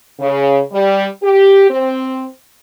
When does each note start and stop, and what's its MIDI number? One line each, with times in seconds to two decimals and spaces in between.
0.20 0.62 49
0.72 1.06 55
1.22 1.70 67
1.70 2.28 60